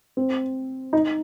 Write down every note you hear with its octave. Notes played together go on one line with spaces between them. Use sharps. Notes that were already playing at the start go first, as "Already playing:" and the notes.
C4
D#4